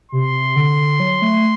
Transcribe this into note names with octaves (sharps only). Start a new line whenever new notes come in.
C3 C6
D3
F#3
A3